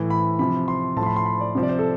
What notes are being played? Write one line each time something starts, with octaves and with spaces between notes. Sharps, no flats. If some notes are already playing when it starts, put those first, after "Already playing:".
Already playing: A2 E3
B5
C3 F3 B5
C6
A2 F3 A5
C6
B5
C6
B5
D5
C3 F3
D5
C5
A4